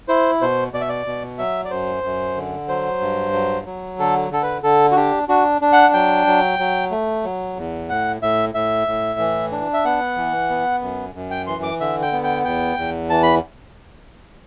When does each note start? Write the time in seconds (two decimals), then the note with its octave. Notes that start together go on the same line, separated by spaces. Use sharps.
0.08 E4 C5
0.41 B2 C5
0.73 B2 D5
0.81 E5
0.89 D5
1.06 B2
1.38 F#3 E5
1.65 D5
1.71 F#2 C5
2.04 F#2
2.36 D3
2.68 F#3 C5
3.01 G2
3.33 F#3
3.66 F#3
3.99 D3 A4
4.31 D3 A4
4.42 B4
4.63 D3 A4
4.91 F#4
4.96 D4 G4
5.29 D4 F#4
5.61 D4
5.73 F#5
5.94 F#3 G5
6.27 F#3
6.59 F#3
6.91 A3
7.24 F#3
7.57 E2
7.89 A2 F#5
8.22 A2 E5
8.54 A2 E5
8.88 A2
9.19 E3
9.52 D4
9.73 E5
9.85 B3 F#5
10.17 E3
10.50 B3
10.82 F#2
11.15 F#2
11.31 G5
11.47 E3 C6
11.63 D6
11.80 D3 E5
12.02 G5
12.13 B3
12.24 G5
12.45 E2 G5
12.77 E2
13.10 E3 A5
13.23 B5